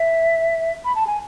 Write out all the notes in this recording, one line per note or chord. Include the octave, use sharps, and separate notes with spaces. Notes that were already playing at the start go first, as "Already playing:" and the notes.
Already playing: E5
B5
A5
G#5